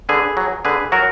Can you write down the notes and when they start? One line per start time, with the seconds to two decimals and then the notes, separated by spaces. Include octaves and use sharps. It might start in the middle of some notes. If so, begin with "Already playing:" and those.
0.09 D3 G#4 B4
0.37 F#3
0.65 D3 G#4 B4
0.92 F#3 F#4 A#4